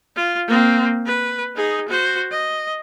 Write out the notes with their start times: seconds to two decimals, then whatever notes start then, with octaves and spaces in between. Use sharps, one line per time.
0.16 F4
0.48 A#3 C4
1.06 B4
1.56 D#4 G#4
1.88 F#4 C5
2.31 D#5